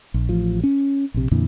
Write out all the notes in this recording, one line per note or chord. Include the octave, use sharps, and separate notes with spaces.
A#1
A1 F3
C#4
A#1 C3
F2 A#2 D3 E3